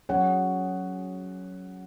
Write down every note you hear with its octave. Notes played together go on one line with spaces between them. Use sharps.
F#3 C#4 G#4 C#5 F#5